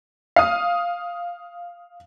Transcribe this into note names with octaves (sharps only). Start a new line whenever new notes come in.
F5 D#6